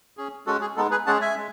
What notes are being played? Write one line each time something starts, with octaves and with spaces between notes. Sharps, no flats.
C#4 G#4
G#3 C#4 F#4 A4
G#4
G#3 B3 D#4 A4
G#4 B4
G#3 C#4 G#4 F#5 A5
E5 G#5
G#3